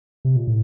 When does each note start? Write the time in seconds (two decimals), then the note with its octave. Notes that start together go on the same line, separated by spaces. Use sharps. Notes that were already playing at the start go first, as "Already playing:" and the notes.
0.25 C3
0.36 A#2
0.47 A2